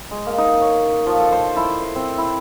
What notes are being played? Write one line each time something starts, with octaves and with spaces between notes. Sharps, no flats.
G#3
A#3
D#4
C#5
F3
A4
C5
E4
C5
C4
E4